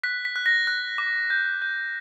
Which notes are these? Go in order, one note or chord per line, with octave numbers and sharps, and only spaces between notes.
F#6 B6
B6
F#6
A#6
F#6
D6
G6
G6